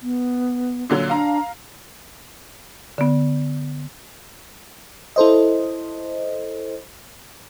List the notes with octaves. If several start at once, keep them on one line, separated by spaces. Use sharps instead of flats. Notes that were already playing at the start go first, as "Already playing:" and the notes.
B3
A#2 D3 F#3
D4 F5 A#5
D3 B3
E4 A4 C5 D#5